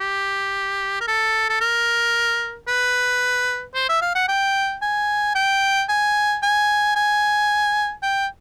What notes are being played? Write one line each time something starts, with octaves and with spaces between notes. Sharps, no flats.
G4
A#4
A4
A4
A#4
B4
C5
E5
F5
F#5
G5
G#5
G5
G#5
G#5
G#5
G5